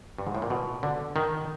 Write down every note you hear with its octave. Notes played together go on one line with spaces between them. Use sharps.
G2
G#2
A2
A#2
B2
D3
D#3